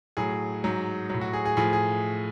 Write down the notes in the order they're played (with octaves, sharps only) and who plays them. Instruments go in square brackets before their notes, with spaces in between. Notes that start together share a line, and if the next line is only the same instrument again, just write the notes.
[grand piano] A2 F#3 G#4
G#2 F#3
A2 F#3
F#4
G#4
G#4
A2 F3 G#4
G#4